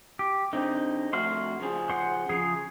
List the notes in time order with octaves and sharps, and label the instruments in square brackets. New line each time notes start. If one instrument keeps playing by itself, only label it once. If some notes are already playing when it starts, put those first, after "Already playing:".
[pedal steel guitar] G4
[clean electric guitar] D3 C4 [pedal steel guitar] D#4
[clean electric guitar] F2 A3 F#4 [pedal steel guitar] C6 F6
[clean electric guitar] C#3 F3 G#4
[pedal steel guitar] C5 F#5
[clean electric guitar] C#3 [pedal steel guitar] F3 G#4